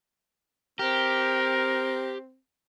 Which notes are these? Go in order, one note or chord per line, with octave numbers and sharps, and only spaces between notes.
C4 G4 A#4